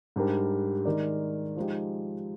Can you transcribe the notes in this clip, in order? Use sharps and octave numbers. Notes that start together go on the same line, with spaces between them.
G#2 G3 D4 G4 A#4
D#3 G#3 D#4 A#4 D5
F3 G#3 D#4 G4